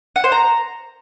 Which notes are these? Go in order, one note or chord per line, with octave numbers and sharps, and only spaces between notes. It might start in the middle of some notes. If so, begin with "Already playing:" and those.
F#5
C5
A#5